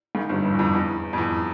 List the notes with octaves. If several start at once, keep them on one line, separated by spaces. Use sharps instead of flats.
G#1 G#2
G1 G2
F2
E2
F2
E2
F2
E2